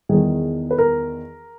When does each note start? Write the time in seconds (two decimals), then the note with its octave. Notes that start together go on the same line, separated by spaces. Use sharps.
0.09 E2 D#3 G#4
0.71 B4
0.78 A#4